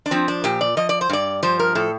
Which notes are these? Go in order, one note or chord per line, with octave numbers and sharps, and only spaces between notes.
D4
F3 C4
D4
A#2 G4
D5
F3 D#5
D5
C5
G2 D5
F3 C5
A#4
A2 A4